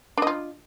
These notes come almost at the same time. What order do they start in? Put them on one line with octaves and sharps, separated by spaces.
D4 D#5 F4